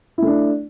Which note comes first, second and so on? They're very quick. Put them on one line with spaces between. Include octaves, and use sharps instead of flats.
E4 A3 D4